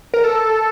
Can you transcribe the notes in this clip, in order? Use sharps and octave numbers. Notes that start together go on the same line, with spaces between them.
A#4
A4